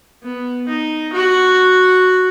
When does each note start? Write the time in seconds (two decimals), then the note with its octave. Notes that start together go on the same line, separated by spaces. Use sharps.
0.23 B3
0.68 D#4
1.14 F#4